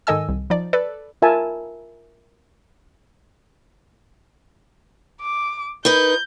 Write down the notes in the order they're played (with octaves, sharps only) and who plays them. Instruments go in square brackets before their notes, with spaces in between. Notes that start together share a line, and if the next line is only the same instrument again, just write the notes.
[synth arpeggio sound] G#2 D#3 A4 D#5 G#5 E6
C2
F3 D#4 D5
A4 B4 D5
[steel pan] F4 A#4 E5 G#5 A5
[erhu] D6
[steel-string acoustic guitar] D#4 A#4 B4 [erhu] G6